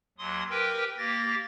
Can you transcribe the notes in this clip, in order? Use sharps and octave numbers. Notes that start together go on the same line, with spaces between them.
D#2 F#3 C6 D#6
G4 A#4 B4 G5
A#3 G4 A6 A#6